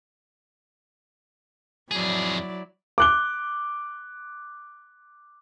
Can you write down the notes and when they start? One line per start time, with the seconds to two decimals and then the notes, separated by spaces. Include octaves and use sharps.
1.91 F2 F#3 E4 G#4 D5
2.98 D6 F#6 G7